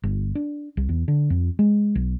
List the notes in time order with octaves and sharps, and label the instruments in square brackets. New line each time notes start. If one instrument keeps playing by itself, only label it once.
[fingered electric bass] G1
D4
C2
E2
D3
F2
G#3
B1